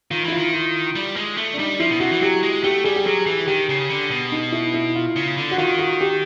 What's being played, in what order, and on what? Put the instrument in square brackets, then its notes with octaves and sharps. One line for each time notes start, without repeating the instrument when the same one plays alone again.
[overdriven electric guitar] D#3 [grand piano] F4
[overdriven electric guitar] E3 [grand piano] E4
[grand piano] F4
[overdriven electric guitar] D#3
[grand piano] F4
[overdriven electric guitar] G3
G#3
A3
[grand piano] D4
[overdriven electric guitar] G3 [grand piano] D#4
[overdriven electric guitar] F3 [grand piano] E4
[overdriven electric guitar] B2
[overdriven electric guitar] C3 [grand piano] F#4
[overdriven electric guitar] E3
[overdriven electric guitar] F#3 [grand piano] G4
[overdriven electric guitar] G#3
[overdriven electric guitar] A3 [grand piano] G4
[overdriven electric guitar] G3 [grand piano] G#4
[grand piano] G4
[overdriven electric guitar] F#3 [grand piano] G#4
[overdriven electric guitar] E3
[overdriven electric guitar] D#3 [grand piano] G4
[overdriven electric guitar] C#3
D3
B2
[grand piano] D#4
E4
E4
F4
[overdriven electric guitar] C#3
D3
[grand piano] F#4
[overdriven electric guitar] D#3 [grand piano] F4
[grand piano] F#4
G4